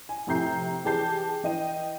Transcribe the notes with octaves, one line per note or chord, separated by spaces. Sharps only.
G#5
F2 A2 C3 A#5 G6 C7
E3 G4 G#4 A5 G6 C7
E3 D#5 G5 D#7